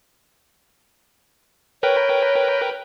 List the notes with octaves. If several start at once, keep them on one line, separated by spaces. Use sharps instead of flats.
A#4 B4 C#5 G5